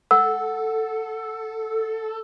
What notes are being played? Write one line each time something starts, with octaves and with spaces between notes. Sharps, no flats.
A4 F#5 E6